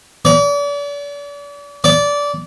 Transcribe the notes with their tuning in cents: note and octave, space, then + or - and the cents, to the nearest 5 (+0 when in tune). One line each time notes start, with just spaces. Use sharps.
D5 -40
D5 -20